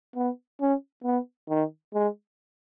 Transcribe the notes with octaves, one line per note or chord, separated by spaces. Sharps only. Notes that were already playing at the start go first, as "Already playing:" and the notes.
B3
C#4
B3
D#3
G#3